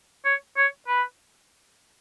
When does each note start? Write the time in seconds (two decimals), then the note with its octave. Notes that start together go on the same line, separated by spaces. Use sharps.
0.25 C#5
0.57 C#5
0.88 B4